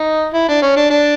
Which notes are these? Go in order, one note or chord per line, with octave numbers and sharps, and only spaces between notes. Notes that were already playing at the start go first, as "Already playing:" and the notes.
Already playing: D#4
E4
D4
C#4
D4
D4